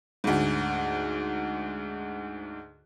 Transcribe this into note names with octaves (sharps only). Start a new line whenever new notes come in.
D2 G#2